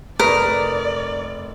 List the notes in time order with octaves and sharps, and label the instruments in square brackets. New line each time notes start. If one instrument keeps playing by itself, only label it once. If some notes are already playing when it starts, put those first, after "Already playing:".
[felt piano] F1 C#6 D#6 [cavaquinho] A#4 [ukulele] B4 [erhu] D5